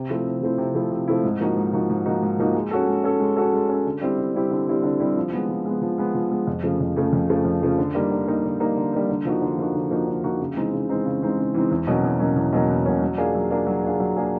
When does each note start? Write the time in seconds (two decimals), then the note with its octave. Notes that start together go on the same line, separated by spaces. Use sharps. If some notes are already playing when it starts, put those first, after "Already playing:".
Already playing: C3
0.10 F3 A3 C4 E4
0.26 C3
0.41 F3 A3 C4 E4
0.58 C3
0.75 F3 A3 C4 E4
0.91 C3
1.08 F3 A3 C4 E4
1.24 G#2
1.40 F3 A#3 D#4 F#4
1.57 G#2
1.73 F3 A#3 D#4 F#4
1.90 G#2
2.06 F3 A#3 D#4 F#4
2.22 G#2
2.39 F3 A#3 D#4 F#4
2.55 G#3
2.71 C#4 F#4 A4
2.87 G#3
3.04 C#4 F#4 A4
3.20 G#3
3.36 C#4 F#4 A4
3.53 G#3
3.69 C#4 F#4 A4
3.86 D3
4.01 G3 C4 E4 G4
4.18 D3
4.35 G3 C4 E4 G4
4.51 D3
4.67 G3 C4 E4 G4
4.83 D3
5.00 G3 C4 E4 G4
5.17 F3
5.33 G#3 B3
5.49 F3
5.65 G#3 B3
5.82 F3
5.98 G#3 B3
6.15 F3
6.31 G#3 B3
6.47 F2
6.63 C#3 F3 A3
6.80 F2
6.96 C#3 F3 A3
7.13 F2
7.29 C#3 F3 A3
7.45 F2
7.61 C#3 F3 A3
7.78 D3
7.95 G3 A#3 D#4
8.11 D3
8.27 G3 A#3 D#4
8.44 D3
8.60 G3 A#3 D#4
8.76 D3
8.93 G3 A#3 D#4
9.09 D3
9.25 F3 A#3 D#4 F#4
9.42 D3
9.58 F3 A#3 D#4 F#4
9.75 D3
9.91 F3 A#3 D#4 F#4
10.07 D3
10.24 F3 A#3 D#4 F#4
10.40 C#3
10.57 E3 G#3 C4 D#4
10.73 C#3
10.89 E3 G#3 C4 D#4
11.05 C#3
11.22 E3 G#3 C4 D#4
11.38 C#3
11.54 E3 G#3 C4 D#4
11.71 E2
11.87 B2 F#3 A#3 C#4
12.03 E2
12.19 B2 F#3 A#3 C#4
12.36 E2
12.53 B2 F#3 A#3 C#4
12.69 E2
12.86 B2 F#3 A#3 C#4
13.02 F#3
13.18 A#3 D4 F4 G#4
13.34 F#3
13.51 A#3 D4 F4 G#4
13.66 F#3
13.83 A#3 D4 F4 G#4
14.00 F#3
14.16 A#3 D4 F4 G#4